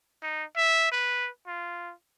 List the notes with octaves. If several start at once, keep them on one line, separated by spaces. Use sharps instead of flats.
D#4
E5
B4
F4